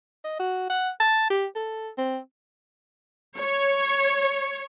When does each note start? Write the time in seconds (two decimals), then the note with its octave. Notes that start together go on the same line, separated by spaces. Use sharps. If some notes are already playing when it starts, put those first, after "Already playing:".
0.24 D#5
0.39 F#4
0.69 F#5
1.00 A5
1.30 G4
1.56 A4
1.98 C4
3.38 C#5